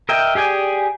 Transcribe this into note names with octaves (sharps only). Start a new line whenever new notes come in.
A#4 D#5 E5 G5
G4 G#4 D5 G#5